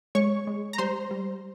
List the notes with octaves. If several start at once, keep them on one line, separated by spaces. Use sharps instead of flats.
G#3 C#5 C#6
G#3
A#5
G3 C5 C6
G3